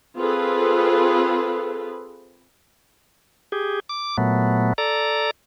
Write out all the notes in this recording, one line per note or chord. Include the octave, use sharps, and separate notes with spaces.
C4 F4 G#4 A4 B4
G4 G#4
D6
A#2 F#3 A3 B3
A4 D5 A#5